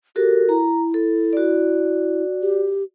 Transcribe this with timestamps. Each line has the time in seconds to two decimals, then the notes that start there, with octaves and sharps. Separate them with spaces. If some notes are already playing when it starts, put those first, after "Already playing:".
0.16 F#4 G4 A4 A#4
0.49 E4 A#5
0.94 A4
1.33 F#4 D5
2.42 G4